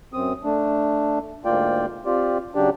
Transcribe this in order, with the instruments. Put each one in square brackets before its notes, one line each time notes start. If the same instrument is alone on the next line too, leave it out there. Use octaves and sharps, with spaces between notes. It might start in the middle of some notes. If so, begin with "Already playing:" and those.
[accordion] F#2 C4 D#6
A3 D4
D2 G#2 A#3 F4 D5 G5
C4 F4 G4 D5
C#3 F#3 D4 G4 D5